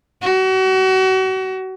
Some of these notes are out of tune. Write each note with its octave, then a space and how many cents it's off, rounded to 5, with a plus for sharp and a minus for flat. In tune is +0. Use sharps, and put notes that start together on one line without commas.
F#4 +35